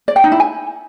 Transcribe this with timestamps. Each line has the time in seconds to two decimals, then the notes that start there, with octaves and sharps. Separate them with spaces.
0.08 D5
0.16 G5
0.24 D#4
0.32 E4
0.40 G#5